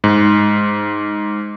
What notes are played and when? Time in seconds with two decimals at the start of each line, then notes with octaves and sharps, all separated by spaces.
0.04 G#2